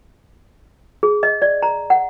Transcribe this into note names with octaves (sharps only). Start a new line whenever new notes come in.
G#4
D#5
D5
A#5
F#5